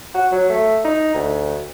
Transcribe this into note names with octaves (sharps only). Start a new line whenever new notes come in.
F#4
F#3
A3
D#4
D2